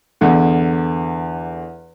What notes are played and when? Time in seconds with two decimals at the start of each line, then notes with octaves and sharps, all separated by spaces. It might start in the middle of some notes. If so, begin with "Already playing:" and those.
0.21 E2 D3